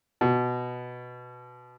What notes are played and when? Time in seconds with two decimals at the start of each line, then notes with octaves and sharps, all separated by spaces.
0.21 B2